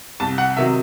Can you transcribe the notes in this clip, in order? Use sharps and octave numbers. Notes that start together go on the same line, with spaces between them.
C2 A5
F#5
C3 D#3 F#3 E5